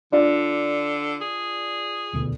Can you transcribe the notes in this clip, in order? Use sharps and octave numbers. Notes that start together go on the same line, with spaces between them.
D3 D4 F4 D5
G#4
D#1 D2 B2